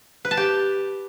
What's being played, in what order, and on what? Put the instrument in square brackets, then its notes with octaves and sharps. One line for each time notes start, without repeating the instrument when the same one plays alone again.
[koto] B4
A5
G4